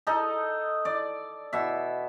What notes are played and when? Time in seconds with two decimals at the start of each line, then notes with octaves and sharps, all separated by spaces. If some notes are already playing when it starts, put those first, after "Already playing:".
0.07 D#4 A4 D#5
0.85 D5
1.53 B2 E5